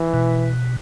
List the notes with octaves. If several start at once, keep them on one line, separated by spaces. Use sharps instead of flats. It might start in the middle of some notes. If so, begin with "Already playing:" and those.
Already playing: E3
B2